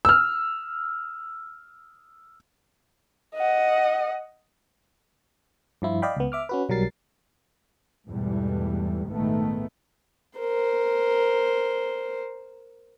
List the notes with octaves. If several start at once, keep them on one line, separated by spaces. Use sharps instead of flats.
E6 F6
D#5 F#5
G2 F3 E4 F4
D5 D#5 F5 G5 B5
C#2 B3
E5 D6 F6
C#4 F#4 B4
B1 F#3 G3 A#4 A6 C7
E2 G#2 B2 E3 G3 A3
A#1 G#2 D#3 A3 B3
A#4 C5